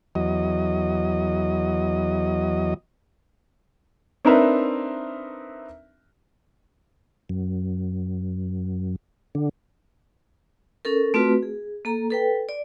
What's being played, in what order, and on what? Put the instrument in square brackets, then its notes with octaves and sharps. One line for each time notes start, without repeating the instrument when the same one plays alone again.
[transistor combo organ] E2 F#3 D#5
[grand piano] C4 D4 D#4 A#4 B4 E5
[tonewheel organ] F#2
D3
[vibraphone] C#4 A4 A#4
A3 C4 F4 F#4 B4
G#4
A#3 A4 A#5
A4 B4 G5
D5